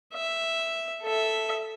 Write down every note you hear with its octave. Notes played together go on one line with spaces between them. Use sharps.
E5
A4 E5